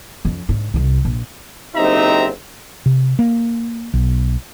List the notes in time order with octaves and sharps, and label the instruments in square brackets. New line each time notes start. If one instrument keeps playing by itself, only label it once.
[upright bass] F2 C#4
G#2 D3
C2 C3
A#1
[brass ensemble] F#1 C3 C4 D#4 E5 A#5
[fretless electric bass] C3
A#3
B1